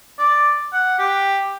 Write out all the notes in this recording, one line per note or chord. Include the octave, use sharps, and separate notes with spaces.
D5
F#5
G4